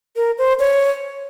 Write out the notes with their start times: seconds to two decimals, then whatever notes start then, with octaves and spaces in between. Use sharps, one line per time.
0.16 A#4
0.38 C5
0.59 C#5